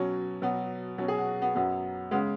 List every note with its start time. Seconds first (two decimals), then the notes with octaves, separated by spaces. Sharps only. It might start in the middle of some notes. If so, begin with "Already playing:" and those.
Already playing: B2 F#3 C#4
0.42 B2 F#3 B3
0.98 B2 F#3 C#4
1.08 G#4
1.18 F#4
1.42 B3
1.55 F#2 F#3 B3
2.11 C#3 G#3 B3